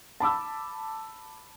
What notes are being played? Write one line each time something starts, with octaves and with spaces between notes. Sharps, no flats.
A5 B5 D6 E6